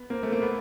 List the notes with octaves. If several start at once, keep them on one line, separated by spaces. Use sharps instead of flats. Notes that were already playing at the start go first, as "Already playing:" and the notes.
Already playing: B3
A#3 C4
A3
A#3
A3 B3